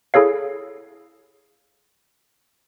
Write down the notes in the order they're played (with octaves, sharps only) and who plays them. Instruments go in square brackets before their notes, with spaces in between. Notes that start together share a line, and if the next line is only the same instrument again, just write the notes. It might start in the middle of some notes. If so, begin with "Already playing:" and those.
[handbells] E4 G#4 A4 C#5 F5